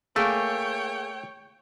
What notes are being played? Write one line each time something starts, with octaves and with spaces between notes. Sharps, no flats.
A3 A#3 G#4 C#5 G5